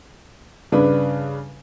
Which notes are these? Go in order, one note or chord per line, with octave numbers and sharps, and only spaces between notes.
G2 C#3 D4 B4